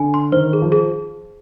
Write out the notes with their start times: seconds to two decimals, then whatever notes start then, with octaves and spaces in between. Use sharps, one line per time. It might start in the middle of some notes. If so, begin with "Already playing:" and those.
Already playing: D3 G#5
0.14 C6
0.32 D#3 C5
0.53 G#4
0.62 F3
0.72 G#4